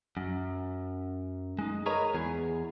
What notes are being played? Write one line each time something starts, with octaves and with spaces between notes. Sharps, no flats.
F#2
G#3 D#4
G#4 A#4 B4 C#5 D#5 A#5
E2 G#4